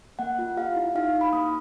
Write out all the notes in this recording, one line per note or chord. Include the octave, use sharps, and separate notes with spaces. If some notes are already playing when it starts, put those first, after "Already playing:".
A#3 F#5
F4
G4 F5
E4
D#4 F5
D#4
B5
A#3 D#6